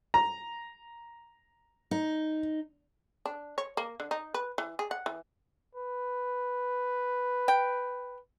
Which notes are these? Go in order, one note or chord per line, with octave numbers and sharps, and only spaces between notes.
A#5
D#4
D4
C#5
A#3
D3
D#4
B4
E3
G#4
F#5
E3
B4
G5